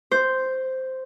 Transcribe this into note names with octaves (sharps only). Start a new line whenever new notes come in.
C5